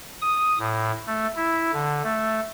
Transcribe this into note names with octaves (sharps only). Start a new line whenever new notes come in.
D#6
A2
A3
E4
D3
A3